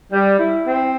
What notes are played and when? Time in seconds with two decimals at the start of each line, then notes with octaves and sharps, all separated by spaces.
0.12 G3
0.39 E4
0.66 C4